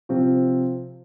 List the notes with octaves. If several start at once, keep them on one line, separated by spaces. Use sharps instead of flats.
C3 F3 C4 F4